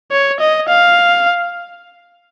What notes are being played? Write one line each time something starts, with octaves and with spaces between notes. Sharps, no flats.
C#5
D#5
F5